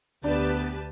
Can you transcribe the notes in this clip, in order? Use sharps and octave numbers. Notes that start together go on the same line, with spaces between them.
D2 B3 D4 G4 B4 A5